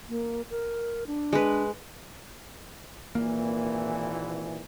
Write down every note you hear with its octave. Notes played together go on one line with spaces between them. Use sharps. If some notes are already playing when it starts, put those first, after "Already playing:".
A#3
A#4
D4
G#3 B4
G#1 A#2 E3 A#3